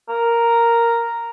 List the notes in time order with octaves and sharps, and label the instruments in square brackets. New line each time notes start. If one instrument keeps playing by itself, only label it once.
[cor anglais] A#4